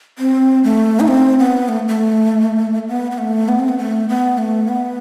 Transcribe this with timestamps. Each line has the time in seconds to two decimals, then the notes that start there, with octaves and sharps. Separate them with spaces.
0.19 C4
0.64 A3
1.00 D#4
1.08 C4
1.39 B3
1.68 A3
1.88 A3
2.88 B3
3.11 B3
3.18 A3
3.48 B3
3.59 C4
3.69 B3
3.78 A3
4.09 B3
4.38 A3
4.68 B3